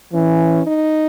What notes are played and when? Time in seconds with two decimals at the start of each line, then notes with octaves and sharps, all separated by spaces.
0.13 E3 C#4
0.67 D#4